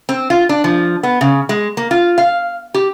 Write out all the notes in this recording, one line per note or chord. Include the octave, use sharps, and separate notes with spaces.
C4
F4
D4
F3
B3
C#3
G#3
A#3
F4
F5
G4